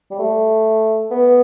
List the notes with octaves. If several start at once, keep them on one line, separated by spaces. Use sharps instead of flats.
G3
A3
B3